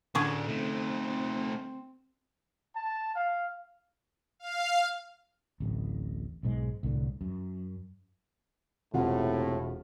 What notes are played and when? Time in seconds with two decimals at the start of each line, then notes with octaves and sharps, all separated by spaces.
0.15 A2 D3 C#4 D4 G#4
0.48 A3 C4 D#4
2.75 A5
3.15 F5
4.39 F5
5.60 D1 A1
6.43 B1 G#2 G#3
6.83 C2 A2 D3
7.21 F#2
8.94 E1 A2 C3 F4 F#5